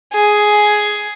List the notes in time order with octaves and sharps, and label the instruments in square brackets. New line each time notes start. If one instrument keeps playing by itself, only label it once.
[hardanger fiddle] G#4